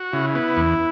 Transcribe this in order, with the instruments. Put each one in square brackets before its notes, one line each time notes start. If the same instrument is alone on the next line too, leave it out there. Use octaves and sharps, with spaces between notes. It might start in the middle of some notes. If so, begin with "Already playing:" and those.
Already playing: [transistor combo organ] F#4
[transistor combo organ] C#3 [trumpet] E4
[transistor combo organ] B3
E2